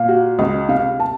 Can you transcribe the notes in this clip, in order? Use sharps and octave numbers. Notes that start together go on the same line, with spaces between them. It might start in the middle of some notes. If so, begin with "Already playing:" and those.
Already playing: A#2 F5
F#4
C#2 D#5
C3 F5
A5